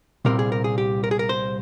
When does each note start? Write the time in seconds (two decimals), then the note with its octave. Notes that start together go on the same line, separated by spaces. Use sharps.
0.25 C2 A#2 G3 C4 A#4
0.39 G#4
0.52 A#4
0.64 G#4
0.78 G4
1.04 A#4
1.11 G#4
1.19 A#4
1.29 C5